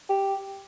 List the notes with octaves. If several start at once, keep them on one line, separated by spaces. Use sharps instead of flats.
G4